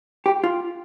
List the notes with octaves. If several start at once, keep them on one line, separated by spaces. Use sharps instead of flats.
G4
F4